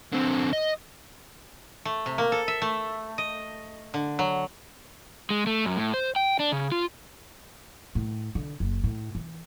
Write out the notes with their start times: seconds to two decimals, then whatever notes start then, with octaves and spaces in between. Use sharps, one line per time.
0.12 D3 C4
0.53 D#5
1.85 A3
2.06 C3
2.18 A#3
2.32 A4
2.48 E5
2.62 A3
3.18 D#5
3.94 D3
4.19 F#3
5.30 G#3
5.47 A3
5.66 F#2
5.77 A2
5.94 C5
6.16 G5
6.40 D4
6.52 C#3
6.72 F4
7.95 A2
8.35 D3
8.60 F#1
8.84 A2
9.15 E3